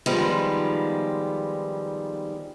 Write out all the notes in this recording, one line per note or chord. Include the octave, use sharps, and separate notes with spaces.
D#3 F3 G3 G#3 B3